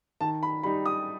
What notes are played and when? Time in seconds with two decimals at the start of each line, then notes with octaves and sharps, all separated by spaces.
0.21 D#3 A5
0.43 B5
0.63 G3 D#4 B5
0.86 D#6